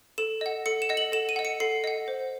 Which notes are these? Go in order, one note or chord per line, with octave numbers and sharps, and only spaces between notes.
A4 E7
D#5 F#5
A4 C#7
E7
D#5 F#5
F#7
A4 E7
D#7
D#5 F#5
C#7
A4 C7
D#5 F#5
C5